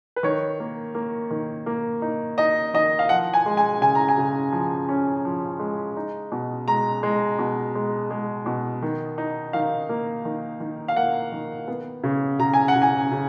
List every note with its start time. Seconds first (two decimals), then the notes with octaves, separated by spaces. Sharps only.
0.16 B4
0.23 D#3 C#5
0.60 A#3
0.95 A#3
1.31 D#3
1.66 A#3
2.02 D#4
2.38 D#4 D#5
2.74 D#3 D#5
2.99 F5
3.09 F3 F#5
3.34 G#5
3.46 G#3
3.57 G#5
3.81 C#3 G#5
3.95 A#5
4.08 G#5
4.18 C#3
4.52 F3
4.89 C#4
5.25 F3
5.60 G#3
5.97 D#4
6.32 B2
6.68 G#3 A#5
7.03 G#3
7.39 B2
7.75 G#3
8.11 G#3
8.46 B2
8.82 D#3
9.18 D#4
9.53 D#3 F5
9.89 A#3
10.25 D#3
10.60 D#3
10.88 F5
10.96 A#3 F#5
11.32 D#3
11.68 B3
12.04 C#3
12.39 C#3 A#5
12.54 G#5
12.68 F#5
12.75 C#3
12.82 G#5
13.12 C#3